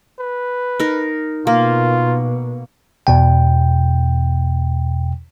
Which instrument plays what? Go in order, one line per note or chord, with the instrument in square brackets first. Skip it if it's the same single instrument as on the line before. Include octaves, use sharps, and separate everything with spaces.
[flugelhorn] B4
[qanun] D#4 A#4
[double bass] B2 [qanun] A#3 [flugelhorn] F4
[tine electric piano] E2 B2 G5